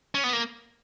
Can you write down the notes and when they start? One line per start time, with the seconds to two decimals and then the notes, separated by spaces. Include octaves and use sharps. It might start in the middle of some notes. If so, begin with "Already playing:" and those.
0.15 C#4
0.24 B3
0.33 A#3